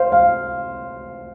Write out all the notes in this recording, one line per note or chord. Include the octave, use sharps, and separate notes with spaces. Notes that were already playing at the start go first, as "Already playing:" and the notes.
Already playing: C5 F5
F5